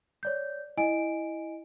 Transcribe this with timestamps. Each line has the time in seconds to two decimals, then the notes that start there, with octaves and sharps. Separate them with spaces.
0.23 C#5 D5 G6
0.77 E4 D#5 G#5 D7